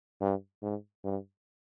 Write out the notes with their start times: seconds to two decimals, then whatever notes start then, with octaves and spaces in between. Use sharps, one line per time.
0.21 G2
0.63 G#2
1.04 G2